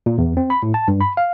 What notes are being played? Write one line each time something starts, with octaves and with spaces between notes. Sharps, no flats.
A#2
E2
C4
B5
A2
A5
G2
B5
F5